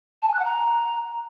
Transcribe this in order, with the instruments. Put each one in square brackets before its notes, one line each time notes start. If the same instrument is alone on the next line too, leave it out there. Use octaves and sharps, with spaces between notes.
[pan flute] A5
G#5
F#6
F#5
A#5